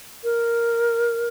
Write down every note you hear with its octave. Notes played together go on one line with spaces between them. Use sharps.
A#4